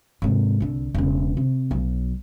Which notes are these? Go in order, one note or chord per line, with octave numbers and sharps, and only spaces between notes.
G#2 C3
C2 D3
E1 C#3
C3
B1 F#3